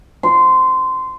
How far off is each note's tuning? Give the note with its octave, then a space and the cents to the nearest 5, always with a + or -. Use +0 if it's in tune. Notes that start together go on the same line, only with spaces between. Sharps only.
C6 -15